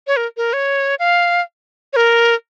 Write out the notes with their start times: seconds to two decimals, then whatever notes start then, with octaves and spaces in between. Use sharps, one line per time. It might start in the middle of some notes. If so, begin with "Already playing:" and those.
0.07 C#5
0.17 A#4
0.37 A#4
0.53 C#5
0.99 F5
1.93 C#5
1.96 A#4